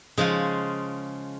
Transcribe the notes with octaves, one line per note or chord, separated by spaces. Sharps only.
C#3 F3 G#3 C#4 F4